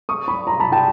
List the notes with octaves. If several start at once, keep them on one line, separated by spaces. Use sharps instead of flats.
C#6 D#6
B5 C#6
A#5 C6
A5 B5
G5 A5